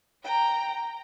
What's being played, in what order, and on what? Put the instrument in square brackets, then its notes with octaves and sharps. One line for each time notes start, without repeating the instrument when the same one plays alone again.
[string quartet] G5 A#5